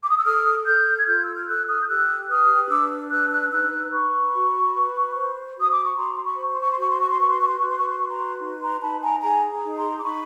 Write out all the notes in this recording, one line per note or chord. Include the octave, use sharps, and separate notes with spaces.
D6
D#6
E6
A4 D#6 F6
A4 F6 G6
G#6
F4 F6 G6
E6
F6
A4 E6 F#6
D#6 F6
G6
G4 E6 F#6
B4 D#6 F6
D4 D6 E6
B4 E6 F#6
E6 F#6
D#4 E6 F#6
B4 B5 C#6
F#4
B4
C5
F#4
D#6
D6
C#6
F#4 A#5 C6
C6
B5 C#6
C5
C6
C#6
C6
F#4 C#6
C6
C#6
C6
B4 C#6
C6
C#6
C6
F#4 C#6
C6
C#6
C6
B4 C#6
A#5 C6
D#4
A#5 C6
D#4 A5 B5
G#5 A#5
G#4 G#5 A#5
D#4
A#5 C6
D6
D#4 B5 C#6